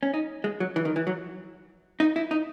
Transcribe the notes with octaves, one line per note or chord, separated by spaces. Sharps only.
C#4
D#4
G#3
F#3
E3
D#3
E3
F#3
D#4
E4
D#4